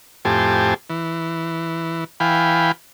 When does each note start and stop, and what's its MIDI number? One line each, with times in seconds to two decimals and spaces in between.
0.25 0.74 41
0.25 0.74 45
0.25 0.74 67
0.25 0.74 72
0.25 0.74 80
0.25 0.74 81
0.90 2.04 52
2.20 2.72 52
2.20 2.72 77
2.20 2.72 79
2.20 2.72 80
2.20 2.72 83